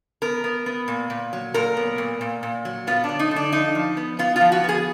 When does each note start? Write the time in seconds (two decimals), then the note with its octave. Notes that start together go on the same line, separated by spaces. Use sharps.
0.22 B3 A#4
0.44 B3
0.66 B3
0.88 A#2
1.10 A#2
1.33 F#3
1.54 A#2 A#4
1.77 B3
1.98 A#2
2.21 A#2
2.43 A#2
2.65 F#3
2.87 B3 F4
3.04 D4
3.09 D3
3.19 D#4
3.31 D3
3.36 D4
3.52 F3 D#4
3.75 F3
3.97 B3
4.19 B3 F4
4.36 F4
4.41 F3
4.52 F#4
4.64 B3 G#4